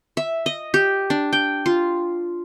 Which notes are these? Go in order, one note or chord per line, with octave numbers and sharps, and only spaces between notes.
E5
D#5
G4
D4
G5
F4